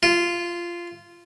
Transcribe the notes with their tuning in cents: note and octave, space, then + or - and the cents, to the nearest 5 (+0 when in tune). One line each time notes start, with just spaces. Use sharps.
F4 -15